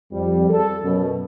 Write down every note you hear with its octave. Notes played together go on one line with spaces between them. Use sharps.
F2 G3
A4
F#2 B2